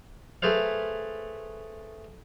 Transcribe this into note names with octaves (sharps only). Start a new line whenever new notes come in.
A3 G#4 B4 C5 F5